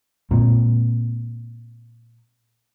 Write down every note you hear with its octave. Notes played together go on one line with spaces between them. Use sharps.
A#2 G#3 A#3 C4